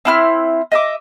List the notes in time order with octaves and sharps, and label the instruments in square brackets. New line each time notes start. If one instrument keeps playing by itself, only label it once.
[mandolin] C4 E4 F6
D#5 E5 D6